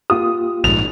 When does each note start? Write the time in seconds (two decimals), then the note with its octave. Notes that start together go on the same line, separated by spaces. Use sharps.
0.10 A#3 F4 G4 D#6
0.64 A#1 G#2 F7